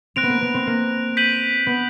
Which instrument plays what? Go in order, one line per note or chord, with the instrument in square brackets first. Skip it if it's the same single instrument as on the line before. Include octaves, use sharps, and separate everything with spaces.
[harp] C4 [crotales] F#6 A#6 D7 F7
[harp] B3
A#3
B3
C4
A#3
[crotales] G6 B6 D#7 F#7
[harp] B3